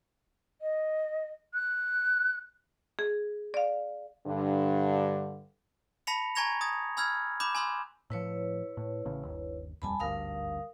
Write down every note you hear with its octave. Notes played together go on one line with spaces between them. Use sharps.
D#5
F#6
G#4
D5 F5
G2 D3
A5 B5 A#6 B6 C#7 F7
G#5 A#5 C#6 G#6 A#6 F7
A#5 D#6 G#6 A6
G#5 B5 E6 F6 G6 G#6
B5 D6 G6 E7
G#5 B5 C6 E6 F#6
A2 F3 E4 B4 C#5
A2
A1 A2 C#3
G1 D#2
D#1 F2 G3 G#5 A5 B5
G#1 D2 G2 A#4 F5 D#6